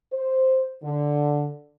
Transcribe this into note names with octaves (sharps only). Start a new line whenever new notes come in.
C5
D3